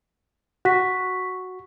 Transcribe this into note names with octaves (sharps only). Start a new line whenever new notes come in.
F#4 C#6 B6